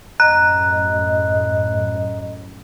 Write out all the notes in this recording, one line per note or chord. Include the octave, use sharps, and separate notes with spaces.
F#2 A2 D#5 A#5 F#6